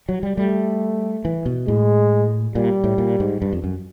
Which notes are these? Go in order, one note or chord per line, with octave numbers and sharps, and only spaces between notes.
F#3
G3
G3 A3
E3
B2
A2 G#3
A#2 G3
A2
A#2
G#2
G2
F2
F#2